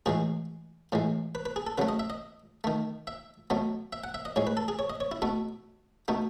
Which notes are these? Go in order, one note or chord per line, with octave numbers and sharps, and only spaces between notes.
A2 E3 G#3 G#4
A2 E3 G#3
B4
B4
G#4
A4
C#3 F#3 A3 B4
D#5
E5
D#5
D#3 A3
E5
B2 F#3 A3
E5
F#5
E5
D#5
A2 G#3 C#5
B4
A4
G#4
C#5
D#5
C#5
E4
B2 A3 E4
B2 A3 D#4